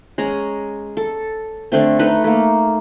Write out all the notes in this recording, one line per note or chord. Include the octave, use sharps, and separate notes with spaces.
G#3 C#4 A#5
A4
D3 A3 C4
A3 D#4 B4
A3 A#3